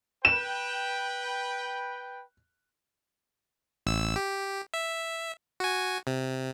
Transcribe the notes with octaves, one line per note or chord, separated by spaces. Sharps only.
B4 G5 E7
A1 E6
G4
E5
F#4 G#5
C3